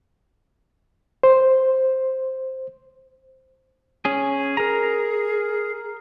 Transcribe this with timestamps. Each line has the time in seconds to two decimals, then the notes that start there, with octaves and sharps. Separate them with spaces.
1.23 C5
4.05 C#4 G#4
4.57 G#4 A#4 A#5